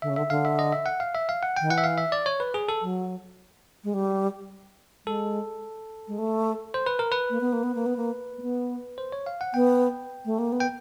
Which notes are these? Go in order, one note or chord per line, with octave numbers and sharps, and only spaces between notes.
D3 E5
C#3
D3 E5
D3 F5
E5
D#5
E5
F#5
F5
E5
F5
F#5
D#3 G5
E3 F#5
E5
F5
E5
D5
C#5
B4
G#4
A4
F#3
G#3
G3
G#3 A4
G#3
A3
C5
B4
A#4
B4
A#3
B3
A#3
B3
A#3
B3
A#3
A#3
B3
C5
C#5
F5
F#5
B3 G5
A3
A#3
B3
G5